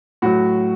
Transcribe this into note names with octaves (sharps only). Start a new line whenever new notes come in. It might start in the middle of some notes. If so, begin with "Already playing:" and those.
A2 F#3 F#4